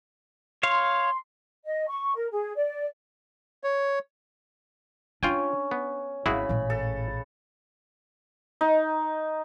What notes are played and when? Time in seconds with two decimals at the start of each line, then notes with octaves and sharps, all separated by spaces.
0.63 C#5 F5 C6
1.65 D#5
1.87 C#6
2.15 A#4
2.31 G#4
2.55 D5
3.64 C#5
5.23 C#4 D4 F4 G5 G#5
5.71 B3
6.26 G#1 C#3 E4 F#4 G#4 B5
6.49 A1 A#2
6.70 A4
8.61 D#4